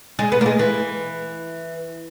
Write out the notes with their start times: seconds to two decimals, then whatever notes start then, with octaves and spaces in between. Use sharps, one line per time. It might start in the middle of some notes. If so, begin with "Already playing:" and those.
0.19 G#3
0.32 B3
0.41 A#3
0.46 G#3
0.59 E3